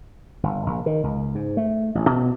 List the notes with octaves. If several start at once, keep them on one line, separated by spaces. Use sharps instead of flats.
G1
A#1
D#3
C#2
G#2
A3
A1
B2